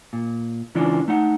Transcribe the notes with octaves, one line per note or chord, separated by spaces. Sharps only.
A#2
C#2 E3 C#4 D4 F4 D5
A3 D#4 F#5